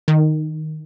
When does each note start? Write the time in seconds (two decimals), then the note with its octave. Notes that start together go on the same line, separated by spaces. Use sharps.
0.08 D#3